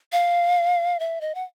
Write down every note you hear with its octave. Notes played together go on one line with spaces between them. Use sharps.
F5
E5
D#5
F#5